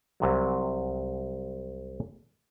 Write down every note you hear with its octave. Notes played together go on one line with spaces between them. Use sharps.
C2 C3 F#3